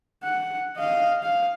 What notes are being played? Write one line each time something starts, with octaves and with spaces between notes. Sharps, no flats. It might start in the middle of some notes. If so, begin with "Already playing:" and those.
F#5
D#5 F5
F5